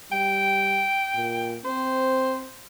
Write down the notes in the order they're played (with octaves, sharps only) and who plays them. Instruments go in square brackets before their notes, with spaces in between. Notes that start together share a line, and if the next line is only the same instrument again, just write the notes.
[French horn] G3 [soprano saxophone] G5
[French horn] A#2
[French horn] C4 [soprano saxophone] C5